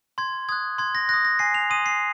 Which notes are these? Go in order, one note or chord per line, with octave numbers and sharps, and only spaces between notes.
C6 G#6
D#6 F#6 G#6
C6 G#6
A#6
D#6 F#6 A#6
A#6
G#5 C7
F7
C6 D#6 D#7
C7